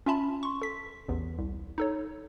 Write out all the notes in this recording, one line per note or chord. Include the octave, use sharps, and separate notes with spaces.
C#4 F4 E5 A5 B5
C6 C#6
A4 B6
A1 E2
C2
D#4 A4 C#5